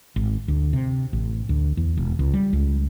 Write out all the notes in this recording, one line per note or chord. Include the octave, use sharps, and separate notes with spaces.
G#1
D2
C3
A1
D2
E2
E1
C#2
G3
C#2